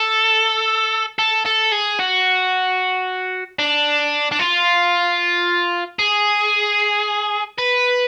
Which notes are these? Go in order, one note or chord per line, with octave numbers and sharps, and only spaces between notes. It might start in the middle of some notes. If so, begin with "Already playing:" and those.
Already playing: A4
A4
A4
G#4
F#4
D4
D4
F4
G#4
B4